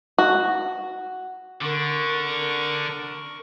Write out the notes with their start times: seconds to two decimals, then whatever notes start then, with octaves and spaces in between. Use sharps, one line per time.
0.18 F#4
1.62 D3 A#4 C#6